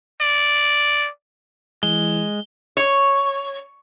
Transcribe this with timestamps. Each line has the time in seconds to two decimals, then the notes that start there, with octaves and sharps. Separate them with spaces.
0.22 D5
1.83 E3 G#3 G7
2.77 C#5